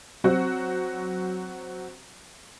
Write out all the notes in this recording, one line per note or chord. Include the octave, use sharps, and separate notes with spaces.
F#3 C4 F#4